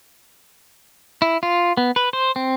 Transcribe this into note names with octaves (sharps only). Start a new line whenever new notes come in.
E4
F4
B3
B4
C5
C4